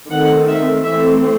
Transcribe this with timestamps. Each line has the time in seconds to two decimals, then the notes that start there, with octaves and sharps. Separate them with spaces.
0.10 D#3 A3 C4 F#5
0.47 E5
0.84 E3 A3 C4 E5